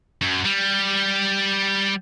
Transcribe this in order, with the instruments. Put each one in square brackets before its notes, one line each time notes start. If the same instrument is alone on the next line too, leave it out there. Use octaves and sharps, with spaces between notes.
[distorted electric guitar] F#2
G3